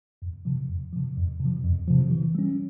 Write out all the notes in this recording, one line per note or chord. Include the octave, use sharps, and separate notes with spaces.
F2
C3 F3
F2
C3 F3
F2
C3
F3
F2
C3 F3
E3
G3 C#4